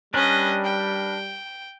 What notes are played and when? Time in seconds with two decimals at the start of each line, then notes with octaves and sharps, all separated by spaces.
0.14 G3 C#4 D4 A#4 B4 D#5
0.64 G5